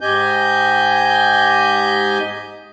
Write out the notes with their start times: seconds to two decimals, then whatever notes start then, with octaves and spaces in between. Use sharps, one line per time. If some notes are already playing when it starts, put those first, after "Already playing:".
0.01 G#2 G4 D#5 G#5 G6